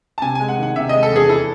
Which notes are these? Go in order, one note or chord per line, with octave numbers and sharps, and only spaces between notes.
A5
C3 G#5
G#5
G#3
F#5
D#3
F#5
C3 E5
G#3 D#5
A4
E2 G#4
E4 A4